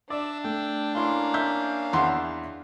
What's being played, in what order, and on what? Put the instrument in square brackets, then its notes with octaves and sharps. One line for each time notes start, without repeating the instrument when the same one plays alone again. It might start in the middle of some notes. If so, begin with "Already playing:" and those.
[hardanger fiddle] D4 [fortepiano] D5 [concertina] E5
[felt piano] A3 [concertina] G5
[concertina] A#3 C#4 F5 [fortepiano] E4 C6
[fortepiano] E5 [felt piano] G6
[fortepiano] E2 [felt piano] E5 F#5 C6